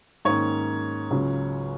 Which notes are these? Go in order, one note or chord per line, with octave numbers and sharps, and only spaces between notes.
G#2 D#3 A#3 C#4 C#5
C#2 C#3 F#3 C#4 F4